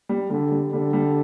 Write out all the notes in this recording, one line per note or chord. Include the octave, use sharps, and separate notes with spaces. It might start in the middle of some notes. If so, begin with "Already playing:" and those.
G3
D3 G3
G3
D3 G3
G3